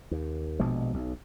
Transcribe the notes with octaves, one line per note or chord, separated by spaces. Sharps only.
D#2
A#1 B2 F3 G#3
B1